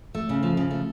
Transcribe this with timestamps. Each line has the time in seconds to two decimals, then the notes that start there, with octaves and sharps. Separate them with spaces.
0.15 A3
0.29 C#3
0.43 F3
0.57 C#3
0.71 A3